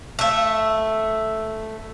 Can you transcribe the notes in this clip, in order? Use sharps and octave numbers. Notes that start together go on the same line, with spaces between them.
A3 E5